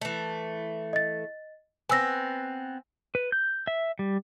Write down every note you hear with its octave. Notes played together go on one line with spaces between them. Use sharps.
E3 A3
D#5 A6
B3 C4 G#5 E6 A#6
B4
G6
E5
G3